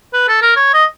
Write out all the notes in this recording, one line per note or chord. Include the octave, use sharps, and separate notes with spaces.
B4
A4
A#4
C#5
D#5